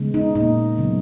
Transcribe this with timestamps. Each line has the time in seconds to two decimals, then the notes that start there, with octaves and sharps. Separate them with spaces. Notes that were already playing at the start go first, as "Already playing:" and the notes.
Already playing: C#3 G#3 B3
0.14 D#4
0.35 A#2 A#3 D#4
0.78 C#3 F#3 B3